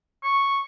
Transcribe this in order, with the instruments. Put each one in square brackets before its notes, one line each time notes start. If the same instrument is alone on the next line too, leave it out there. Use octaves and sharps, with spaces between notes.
[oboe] C#6